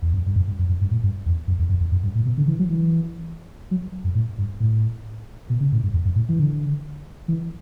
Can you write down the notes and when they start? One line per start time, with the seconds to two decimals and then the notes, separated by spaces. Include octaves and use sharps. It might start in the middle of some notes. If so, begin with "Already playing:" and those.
0.02 E2
0.14 F#2
0.26 G2
0.36 F#2
0.48 G2
0.59 F#2
0.69 F#2
0.81 G2
0.91 A2
1.04 G2
1.26 E2
1.48 F#2
1.59 E2
1.70 F#2
1.81 E2
1.92 F#2
2.04 G2
2.15 A2
2.26 B2
2.38 D3
2.47 E3
2.59 F#3
2.70 E3
3.71 F#3
4.04 F#2
4.15 A2
4.38 G2
4.60 A2
5.50 B2
5.60 C#3
5.72 A2
5.83 G2
5.94 E2
6.05 F#2
6.15 A2
6.29 E3
6.39 D3
7.28 E3